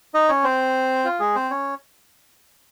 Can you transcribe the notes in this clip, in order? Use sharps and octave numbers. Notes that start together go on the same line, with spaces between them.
D#4 D#5
C#4 C#5
C4 C5
F4
G#3 G#4
C4 C5
C#4 C#5